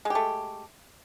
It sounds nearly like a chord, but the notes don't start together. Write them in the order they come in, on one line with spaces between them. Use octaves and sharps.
G#3 G4 A3